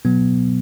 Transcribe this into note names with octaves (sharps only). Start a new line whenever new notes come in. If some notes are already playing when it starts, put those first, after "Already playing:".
B2 F#3 B3